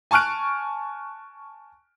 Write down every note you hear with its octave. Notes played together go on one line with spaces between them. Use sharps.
G#5 A5 C#6 F6 F#6 D7